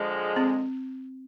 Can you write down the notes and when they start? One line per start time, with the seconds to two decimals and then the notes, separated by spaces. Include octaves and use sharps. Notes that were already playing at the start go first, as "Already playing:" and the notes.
Already playing: D3 F3 G#3
0.36 C4